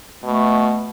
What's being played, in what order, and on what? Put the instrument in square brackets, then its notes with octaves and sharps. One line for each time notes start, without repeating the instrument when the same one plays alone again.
[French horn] B2 [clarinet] A3